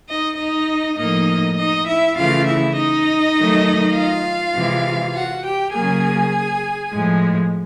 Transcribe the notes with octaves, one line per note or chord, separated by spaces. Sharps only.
D#4 D#5
D#4 D#5
A2 F3 A#3 D#4 D#5
D#4 D#5
E4 E5
C#3 E3 A3 F4 F5
E4 E5
D#4 D#5
D#3 F#3 A3
F4 F5
C3 E3 G#3
F#4 F#5
G4 G5
C#3 F#3 A#3 G#4 G#5
A2 F3 G#3